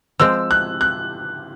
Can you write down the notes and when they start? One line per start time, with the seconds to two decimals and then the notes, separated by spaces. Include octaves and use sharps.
0.19 F3 G#3 C4 E6
0.51 F#6
0.81 F#6